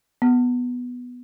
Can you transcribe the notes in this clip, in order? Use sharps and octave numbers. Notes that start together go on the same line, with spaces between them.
B3